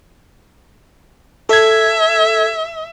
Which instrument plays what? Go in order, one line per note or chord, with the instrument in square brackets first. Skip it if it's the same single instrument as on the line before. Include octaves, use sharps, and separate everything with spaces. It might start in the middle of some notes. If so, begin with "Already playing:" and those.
[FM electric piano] A4 G#6 [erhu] E5